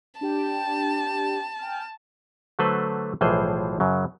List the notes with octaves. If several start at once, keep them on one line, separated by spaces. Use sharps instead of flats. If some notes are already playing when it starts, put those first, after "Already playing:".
D4 G4 G5 A5
G5 G#5 F6
D3 F#3 A3 A4 B4 C5
B1 A2 E3 F3 G#4 C5
F#2 C#3 F#3